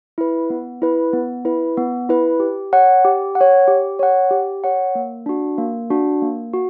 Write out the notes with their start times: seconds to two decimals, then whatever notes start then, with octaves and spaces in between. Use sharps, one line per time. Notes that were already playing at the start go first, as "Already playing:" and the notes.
0.18 E4 B4
0.50 B3
0.82 E4 B4
1.13 B3
1.45 E4 B4
1.77 B3
2.09 E4 B4
2.40 G4
2.73 C#5 F#5
3.05 G4
3.35 F#5
3.41 C#5
3.68 G4
3.99 C#5 F#5
4.31 G4
4.64 C#5 F#5
4.95 A#3
5.26 D4 F#4
5.58 A#3
5.90 D4 F#4
6.22 A#3
6.53 F#4